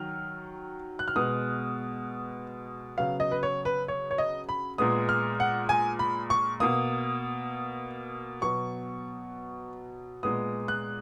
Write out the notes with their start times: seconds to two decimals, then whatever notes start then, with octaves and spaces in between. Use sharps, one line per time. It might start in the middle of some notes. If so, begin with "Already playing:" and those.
Already playing: D#3 F#3 F6
0.99 F#6
1.08 F6
1.16 B2 G#3 B3 D#6
2.97 C#3 F#3 B3 F5
3.20 D#5
3.31 B4
3.43 C#5
3.65 B4
3.88 C#5
4.11 C#5
4.18 D#5
4.49 B5
4.78 A#2 G#3 B3 D#6
5.09 F6
5.40 F#5
5.69 G#5
5.99 B5
6.30 C#6
6.60 B2 A#3 D#6
8.41 B2 F#3 B3 C#6
10.23 A#2 G#3 B3 D#6
10.68 F#6